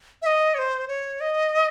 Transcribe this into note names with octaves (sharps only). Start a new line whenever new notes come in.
E5
D#5
C#5
C5
C#5
D#5